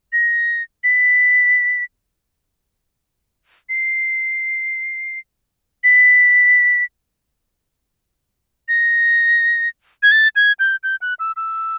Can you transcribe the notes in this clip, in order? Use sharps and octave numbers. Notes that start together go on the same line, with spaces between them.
A#6
B6
C7
B6
A#6
G#6
A6
G#6
G6
G6
F#6
E6
E6